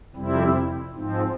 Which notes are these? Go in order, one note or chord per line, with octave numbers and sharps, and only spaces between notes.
F2 C3 G3 C4 E4
G#2 F3 C4